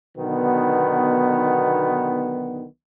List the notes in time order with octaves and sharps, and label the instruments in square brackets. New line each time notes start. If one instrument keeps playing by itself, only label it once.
[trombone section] B1 B2 D3 D#3 B3